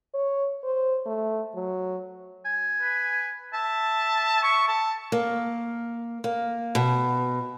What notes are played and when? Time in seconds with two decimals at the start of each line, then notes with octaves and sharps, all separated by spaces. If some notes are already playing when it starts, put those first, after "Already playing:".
0.14 C#5
0.64 C5
1.06 A3
1.55 F#3
2.45 G#5
2.81 B4
3.53 E5 A5
4.43 C#6
4.68 A5
5.12 A#3
6.24 A#3
6.75 B2